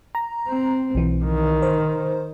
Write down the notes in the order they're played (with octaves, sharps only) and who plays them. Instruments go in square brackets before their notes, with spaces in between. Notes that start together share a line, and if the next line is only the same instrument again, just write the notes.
[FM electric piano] A#5
[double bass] C4
[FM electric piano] B1 E3
[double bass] D#3
[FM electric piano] C5